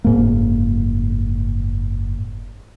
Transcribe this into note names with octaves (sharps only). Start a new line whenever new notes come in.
F#1 G#2 A#3